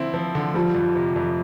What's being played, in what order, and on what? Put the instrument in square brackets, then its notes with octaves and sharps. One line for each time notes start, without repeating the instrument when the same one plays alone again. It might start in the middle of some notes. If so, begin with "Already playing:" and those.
Already playing: [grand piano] D3 F3 C4 E4
F3
D3
[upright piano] F3 [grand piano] G3
[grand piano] F2
C3
F2